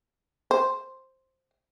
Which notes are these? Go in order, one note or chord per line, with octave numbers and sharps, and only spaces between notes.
C5